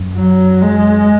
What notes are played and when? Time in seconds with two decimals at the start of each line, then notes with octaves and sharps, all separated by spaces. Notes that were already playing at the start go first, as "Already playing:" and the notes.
Already playing: F#2
0.16 F#3
0.62 G#3